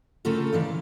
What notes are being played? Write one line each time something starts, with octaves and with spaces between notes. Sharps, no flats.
C#3 A3 C4 F4 A4 A#4
D#3 E3 D5 F5